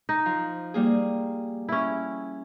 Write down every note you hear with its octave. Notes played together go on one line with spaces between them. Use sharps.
D#4
F3
G3 A#3 G#4
C#4 E4